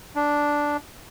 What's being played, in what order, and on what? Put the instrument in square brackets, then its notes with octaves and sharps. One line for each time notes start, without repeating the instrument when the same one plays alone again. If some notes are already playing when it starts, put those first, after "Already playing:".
[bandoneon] D4